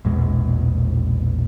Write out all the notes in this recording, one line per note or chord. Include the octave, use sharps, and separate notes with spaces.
A#1 E2 B2 G#3